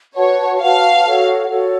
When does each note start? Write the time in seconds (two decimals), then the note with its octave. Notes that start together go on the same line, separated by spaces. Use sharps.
0.16 F#4 B4 C#5 F#5 A5
0.61 F#4 B4 F5 F#5 A5
1.05 F#4 A4 C#5 F#5
1.50 F#4 A4 C#5 F#5